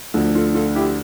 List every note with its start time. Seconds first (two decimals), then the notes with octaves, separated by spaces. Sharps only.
0.14 D2 D3 F3
0.35 F4 A4
0.54 F4 A4
0.75 E4 G4